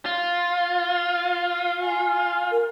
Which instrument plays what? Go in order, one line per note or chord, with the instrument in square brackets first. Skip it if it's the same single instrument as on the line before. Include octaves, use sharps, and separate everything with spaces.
[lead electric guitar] F4
[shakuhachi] G#5
A#4